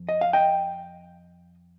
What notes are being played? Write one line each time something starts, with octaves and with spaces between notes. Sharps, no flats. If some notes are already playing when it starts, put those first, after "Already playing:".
Already playing: F2
D#5
F5
D#5 G5